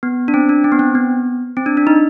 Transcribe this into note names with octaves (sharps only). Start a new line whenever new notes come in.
B3
D4
C4
D4
C4
B3
C4
B3
C4
D4
D4
D#4